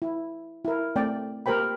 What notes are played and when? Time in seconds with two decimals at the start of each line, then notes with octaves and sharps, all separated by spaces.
0.02 E4
0.65 E4 A#4
0.96 A3 C4 D5 G5
1.46 A#3 G4 A#4 C5 G5 B5